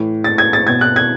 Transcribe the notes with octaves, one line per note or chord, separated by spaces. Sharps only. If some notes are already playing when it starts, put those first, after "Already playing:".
Already playing: A2 E3
A6
G#6
A6
B2 G#6
F#6
G#6